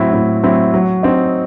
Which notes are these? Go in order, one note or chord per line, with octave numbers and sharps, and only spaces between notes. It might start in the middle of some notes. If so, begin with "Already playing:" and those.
Already playing: A2 F#3 C4 E4
A2
F#3 C4 E4
F#3
C4 D#4